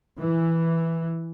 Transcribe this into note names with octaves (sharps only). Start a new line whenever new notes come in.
E3